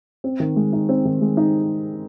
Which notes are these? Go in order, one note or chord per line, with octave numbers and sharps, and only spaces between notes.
C4
D#3
G#3
D#4
C4
D#3
G#3
D#4